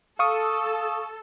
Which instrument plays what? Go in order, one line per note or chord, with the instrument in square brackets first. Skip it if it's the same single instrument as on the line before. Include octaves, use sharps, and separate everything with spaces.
[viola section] A4 [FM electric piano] F5 C#6 D#6